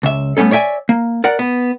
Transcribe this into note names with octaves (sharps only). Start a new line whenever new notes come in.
C#2 E5
G3 A3 B3 C#4 A4
C#5 D5 E5 G5 G#5
A#3
A#4 D5 F#5
B3